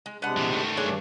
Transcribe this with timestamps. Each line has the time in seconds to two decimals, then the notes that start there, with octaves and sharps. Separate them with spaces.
0.06 G#3
0.22 C3 G#3 B3 D4 F#5
0.37 A#2 E3
0.51 D#3 A3
0.77 G2 D4 G#4 C#5